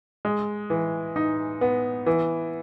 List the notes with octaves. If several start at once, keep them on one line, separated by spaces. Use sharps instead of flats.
G#3
E3
D#4
B3
E3